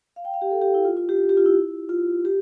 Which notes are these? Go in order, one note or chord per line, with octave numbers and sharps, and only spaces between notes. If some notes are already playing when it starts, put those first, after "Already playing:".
F5
G5
F5
G4
A4
G4
E4
F4
F4
G4
G4
F4
E4
F4
G4